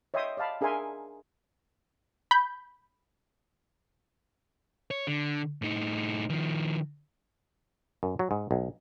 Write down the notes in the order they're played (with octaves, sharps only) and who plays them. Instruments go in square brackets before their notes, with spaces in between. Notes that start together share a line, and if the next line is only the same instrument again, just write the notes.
[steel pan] C#5 D#5 E5 G5 C6 D#6
D5 D#5 F5 A5 B5
D4 G#4 A#4 E5 G#5 C6
[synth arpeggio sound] B5 G6
[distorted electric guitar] C#5
D3
A2 D#4
D#3 F3
[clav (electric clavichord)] F#2
F#3
G#2
B1